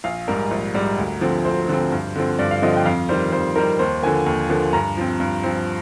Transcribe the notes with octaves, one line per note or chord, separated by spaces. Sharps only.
A#1 F5
G#2 G3 A#4
A#1
G#2 G3
D2
D3 F3 C4
D2 C5
D3 F3 C4
G2
D3 F3 C4
G2 D5
F5
D3 F3 C4 D#5
G5
F2 F5
D#3 G3 C5
F2 C5
D#3 G3 A#4
D#2 C5
D3 F3 A#3 G#5
D#2
D3 F3 A#3
G2 A#5
F3 C4
G2
F3 C4